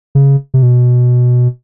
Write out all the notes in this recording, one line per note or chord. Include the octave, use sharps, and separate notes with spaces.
C#3
C3
B2